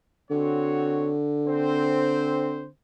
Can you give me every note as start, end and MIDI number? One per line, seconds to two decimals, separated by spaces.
0.31 2.68 50
0.31 1.15 60
0.31 1.15 66
0.31 1.15 73
1.46 2.66 60
1.46 2.66 72